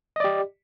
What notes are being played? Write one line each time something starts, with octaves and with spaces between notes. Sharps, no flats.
G4 D5 D#5